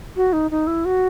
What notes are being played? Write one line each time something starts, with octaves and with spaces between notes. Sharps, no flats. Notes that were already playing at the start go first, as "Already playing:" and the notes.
F#4
D#4
D#4
E4
F#4